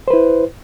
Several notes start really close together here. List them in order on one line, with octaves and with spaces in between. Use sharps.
C5 B4 E4